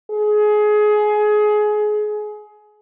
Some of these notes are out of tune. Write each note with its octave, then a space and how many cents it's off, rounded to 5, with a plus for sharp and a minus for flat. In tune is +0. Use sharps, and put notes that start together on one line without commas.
G#4 +20